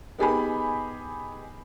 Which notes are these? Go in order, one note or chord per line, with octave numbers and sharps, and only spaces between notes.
B3 D#4 G4 G#4 G#5 B5